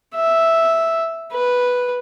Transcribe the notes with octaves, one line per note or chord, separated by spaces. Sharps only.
E5
B4